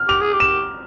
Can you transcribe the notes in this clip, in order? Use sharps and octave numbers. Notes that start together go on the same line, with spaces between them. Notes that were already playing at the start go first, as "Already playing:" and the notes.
Already playing: F6
G4 F7
G#4
G4
E7